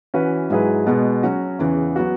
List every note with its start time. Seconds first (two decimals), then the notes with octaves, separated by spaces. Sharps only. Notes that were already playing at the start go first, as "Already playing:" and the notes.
0.14 E3 C#4 F#4 B4
0.50 G#2 F#3 E4 G#4 B4
0.87 B2 G#3 B3
1.23 F#3 C#4 F#4
1.59 E2 C#3 E3
1.96 F#3 B3 F#4